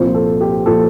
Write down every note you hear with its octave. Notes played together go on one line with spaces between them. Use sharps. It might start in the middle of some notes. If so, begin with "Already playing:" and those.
Already playing: C2 A#2 F3 C5
A4
G4
A#2 F3 A4